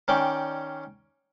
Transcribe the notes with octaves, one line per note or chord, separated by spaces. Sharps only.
D#3 C#4 D5 G5